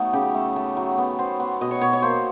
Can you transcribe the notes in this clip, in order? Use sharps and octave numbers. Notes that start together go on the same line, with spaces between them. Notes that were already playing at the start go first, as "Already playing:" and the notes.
Already playing: F#3 A3 B3 D#4
C#3 G4
A3
A3
F#3
B3
B3 C5
B3
B2 D#5
C#5
B2 C#5
C#5
A#3 C5